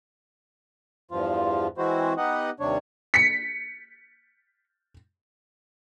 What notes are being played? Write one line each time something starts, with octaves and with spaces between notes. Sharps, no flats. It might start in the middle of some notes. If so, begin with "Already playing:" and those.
E2 G2 F3 F4
E3 G#3 C4 E4 F#4 C5
B3 D#4 G4 D#5 F#5
D#2 C3 G3 D4 C#5
B6 C#7